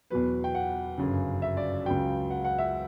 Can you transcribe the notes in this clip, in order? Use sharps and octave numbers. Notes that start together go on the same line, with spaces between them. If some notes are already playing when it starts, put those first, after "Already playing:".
E2 B2 F#3 B4
G5
F#5
G1 F#2 C#3
E5
D5
C#2 C#3 F#3 G5
F#5
F#5
E5